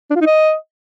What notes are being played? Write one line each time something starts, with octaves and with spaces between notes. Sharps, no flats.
D4
F4
D#4
D#5